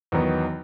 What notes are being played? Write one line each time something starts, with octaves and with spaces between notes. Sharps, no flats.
E2 D#3 F#3 B3 D#4